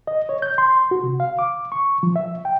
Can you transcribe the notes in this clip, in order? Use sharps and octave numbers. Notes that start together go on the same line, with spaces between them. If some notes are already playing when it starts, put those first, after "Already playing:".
D#5
C#5
G6
C6
F#4
C3
F5
D6
C#6
F3
E5
G5